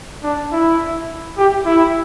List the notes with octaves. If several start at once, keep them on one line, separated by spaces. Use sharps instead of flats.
D4
E4
G4
E4